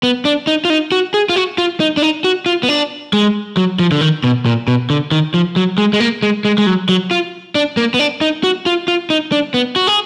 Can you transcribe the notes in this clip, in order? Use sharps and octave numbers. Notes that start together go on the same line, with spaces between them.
B3
D4
D#4
F4
D#4
F#4
G#4
F4
F#4
F4
D#4
D4
D#4
F#4
F4
B3
D4
G#3
F#3
F3
D3
D#3
B2
A#2
B2
D3
D#3
F3
F#3
G#3
G#3
A#3
G#3
G#3
G#3
F#3
F#3
F4
D4
A#3
B3
D4
D#4
F#4
F4
F4
D#4
D4
B3
F#4
G#4